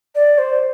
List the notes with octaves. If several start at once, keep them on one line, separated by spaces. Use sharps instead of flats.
D5
C5